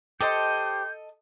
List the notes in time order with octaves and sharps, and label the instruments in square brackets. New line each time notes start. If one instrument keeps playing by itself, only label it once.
[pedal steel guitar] G4 C5 [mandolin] A4 D#5 [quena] G6